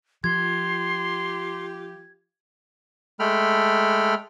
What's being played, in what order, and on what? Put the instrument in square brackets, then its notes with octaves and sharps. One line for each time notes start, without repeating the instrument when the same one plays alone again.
[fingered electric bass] F3 [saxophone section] F4 G4 [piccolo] C6 [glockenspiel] G#6
[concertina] G#3 A3 A4 G5 B5 F6